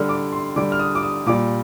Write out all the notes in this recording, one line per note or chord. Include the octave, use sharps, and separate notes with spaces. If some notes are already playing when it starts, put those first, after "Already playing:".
Already playing: D3 G3 F6
D6
C6
D3 G3 D6
F6
D#6
D6
D#6
A#2 G3 D6